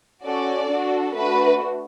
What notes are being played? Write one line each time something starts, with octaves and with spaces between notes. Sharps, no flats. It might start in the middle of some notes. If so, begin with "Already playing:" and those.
C#4 F#4 A4 D5
D4 F#4 A4
A3 D4 F#4 B4